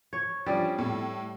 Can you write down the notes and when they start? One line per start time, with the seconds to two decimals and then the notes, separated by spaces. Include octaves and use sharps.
0.13 C#5
0.46 F3 G3 C#4 D4
0.78 A2